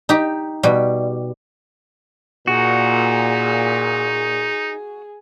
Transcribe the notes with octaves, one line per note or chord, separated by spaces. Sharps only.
D#4 G4
B2 G3
A#2 D#4 F#4 G#4